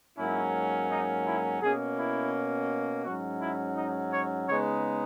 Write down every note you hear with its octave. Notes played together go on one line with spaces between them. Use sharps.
G#2 F#3 A#3 C#4 E4
D#4
E4
B2 A#3 C#4 G#4
E4
G#2 F#3 C#4 F#4
E4
D#4
C#5
C#3 G#3 B3 D#4 C#5